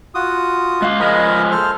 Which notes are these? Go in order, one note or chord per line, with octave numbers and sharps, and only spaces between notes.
F4 F#4 D#6
G#3 F5
F3 G#3 A#4 D#5 B5
A4 C5 F6